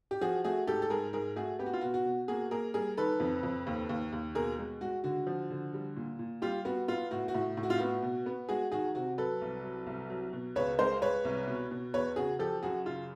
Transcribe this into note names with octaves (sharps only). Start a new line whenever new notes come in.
G4
F3 F#4 G#4
A3 F#4 G#4
G#2 G4 A4
A4
G#2 G#4 A#4
G#2 G#4 A#4
A3 F#4 G#4
B3 G4
F#4
F4
B2 F#4
F#4
B2
A#3 F#4 G#4
A#3 G#4 A#4
G3 G#4 A#4
D#3 A4 B4
F2
F2
D#2
D#2
D#2
B2 G#4 A#4
G#3
G#3 F#4
D3 F#4
F3
D3
G3
A#2
A#2
G3 F4 G4
B3 F#4
B3 F4
A2 F#4
F#4
A2
A2
F#4
F4
B3 F#4
B2
B3
G#3 F#4 G#4
D#3 F#4 G#4
C3 F#4
F#3 A4 B4
C2
F#3
C2
F#3
B2
C#2 B4 C#5
G#3 A#4 C5
G#3 B4 C#5
C2
B2
B2
E2 B4 C#5
C#3 F#4 G#4
F3 G4 A4
F#2 F#4 G#4
C#3 F4